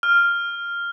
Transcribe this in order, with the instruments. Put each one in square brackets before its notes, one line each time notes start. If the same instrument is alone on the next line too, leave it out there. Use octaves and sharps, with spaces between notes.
[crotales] F6